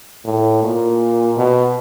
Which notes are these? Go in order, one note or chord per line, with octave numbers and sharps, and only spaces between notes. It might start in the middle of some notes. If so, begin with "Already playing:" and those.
A2
A#2
B2